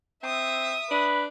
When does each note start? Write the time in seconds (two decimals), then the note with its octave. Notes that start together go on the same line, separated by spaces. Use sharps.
0.23 C4 E5 D#6
0.91 D4 B4